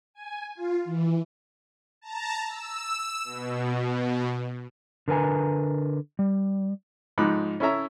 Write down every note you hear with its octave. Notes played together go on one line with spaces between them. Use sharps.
G#5
F4
E3
A5 A#5
E6
B2
D3 A#4 B4 G#5 A#5
G3
G#2 F3 D#4 B5 D6 F#6
C#4 E4 A4 C#5 E5 A#5